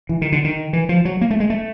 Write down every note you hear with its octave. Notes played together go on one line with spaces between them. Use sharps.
E3
D#3
D3
D#3
E3
F3
F#3
A#3
A3
G#3
A3